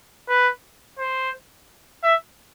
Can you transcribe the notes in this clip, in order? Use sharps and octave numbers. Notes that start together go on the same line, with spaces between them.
B4
C5
E5